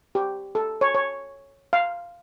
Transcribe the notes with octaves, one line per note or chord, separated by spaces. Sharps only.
G4
A4
C#5
C#5
F5